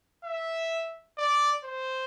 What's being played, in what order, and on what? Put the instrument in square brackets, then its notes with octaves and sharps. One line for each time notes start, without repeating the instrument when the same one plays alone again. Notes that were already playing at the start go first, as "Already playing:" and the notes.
[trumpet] E5
D5
C5